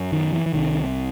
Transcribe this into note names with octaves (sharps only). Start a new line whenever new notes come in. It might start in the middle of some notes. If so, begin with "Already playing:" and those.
Already playing: F#2
D#3
E3
E3
C2 C3 D#3